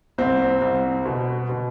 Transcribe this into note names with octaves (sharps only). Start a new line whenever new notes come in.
C2 C4
C2
B2
B2